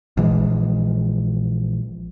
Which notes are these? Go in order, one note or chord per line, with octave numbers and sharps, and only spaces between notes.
A#1 E3 G#3